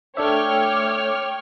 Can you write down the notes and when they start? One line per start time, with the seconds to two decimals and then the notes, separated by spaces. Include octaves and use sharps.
0.17 A3 D4 C#5 E5 G5 D6 F6